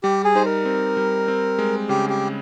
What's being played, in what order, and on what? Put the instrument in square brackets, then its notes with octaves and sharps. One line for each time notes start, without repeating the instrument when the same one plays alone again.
[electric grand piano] G3 [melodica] G4
[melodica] G#4
[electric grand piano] D#4 [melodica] C5
[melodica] A#4
[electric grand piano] C4
G3
C4
G#3
[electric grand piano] C#3 [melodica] G4
[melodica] G4